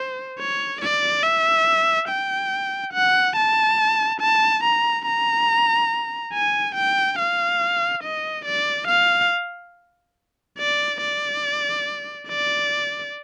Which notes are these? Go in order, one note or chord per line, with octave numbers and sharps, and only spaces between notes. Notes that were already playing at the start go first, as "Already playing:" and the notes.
Already playing: C5
C#5
D5
E5
G5
F#5
A5
A5
A#5
A#5
G#5
G5
F5
D#5
D5
F5
D5
D5
D5